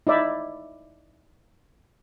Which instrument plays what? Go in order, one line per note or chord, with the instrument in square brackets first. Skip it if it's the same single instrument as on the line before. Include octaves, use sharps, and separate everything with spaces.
[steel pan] D#4 E4 D5 E5